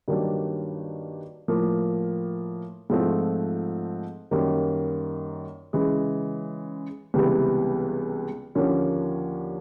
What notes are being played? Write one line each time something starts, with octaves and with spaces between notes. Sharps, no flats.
G2 D#3 F#3 A#3 D4
A2 F3 A#3
G#2 F3 A3 C4 F4
F#2 D#3 G3 A#3
C#3 E3 G#3
C#2 C3 E3 G3 B3
D#2 D3 F3 A#3 C#4